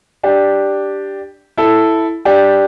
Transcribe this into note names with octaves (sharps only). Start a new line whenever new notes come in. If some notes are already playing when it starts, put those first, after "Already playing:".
D4 G4
E4 A4
D4 G4